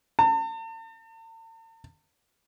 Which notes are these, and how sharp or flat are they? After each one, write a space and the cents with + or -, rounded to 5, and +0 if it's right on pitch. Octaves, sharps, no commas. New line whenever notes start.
A5 +45